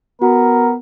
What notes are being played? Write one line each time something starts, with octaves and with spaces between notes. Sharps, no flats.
B3 F#4 A#4